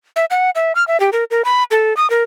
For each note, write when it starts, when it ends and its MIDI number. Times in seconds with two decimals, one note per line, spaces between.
0.16 0.25 76
0.31 0.50 78
0.55 0.73 76
0.75 0.86 89
0.88 1.00 76
1.00 1.10 67
1.13 1.24 70
1.31 1.44 70
1.45 1.64 83
1.71 1.96 69
1.97 2.09 87
2.10 2.23 70